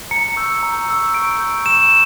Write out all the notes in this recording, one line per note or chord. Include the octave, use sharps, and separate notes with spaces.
A#5 C#7
C#6 E6 G6
A#5
C#6 E6 G6
C#6 D7
E6 G6
C#6 E7